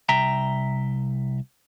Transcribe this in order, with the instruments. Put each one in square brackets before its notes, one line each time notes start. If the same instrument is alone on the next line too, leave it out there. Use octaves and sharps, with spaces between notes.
[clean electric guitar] C2 E5 G5 A#5